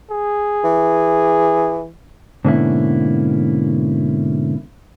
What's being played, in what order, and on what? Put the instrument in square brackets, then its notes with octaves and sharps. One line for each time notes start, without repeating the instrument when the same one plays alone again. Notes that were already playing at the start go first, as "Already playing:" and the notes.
[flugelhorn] G#4
[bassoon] E3
[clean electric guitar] G#2 B2 D3 A#3 C#4 E4